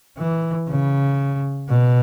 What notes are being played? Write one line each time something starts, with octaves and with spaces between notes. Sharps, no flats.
E3
C#3
B2